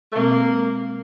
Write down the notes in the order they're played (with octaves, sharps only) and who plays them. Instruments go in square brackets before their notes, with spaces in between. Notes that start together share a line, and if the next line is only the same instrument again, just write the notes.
[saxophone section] A3
[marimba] B2 G#3 C4 [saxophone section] A#3